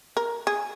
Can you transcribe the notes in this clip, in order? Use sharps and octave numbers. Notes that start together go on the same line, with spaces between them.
A#4
G#4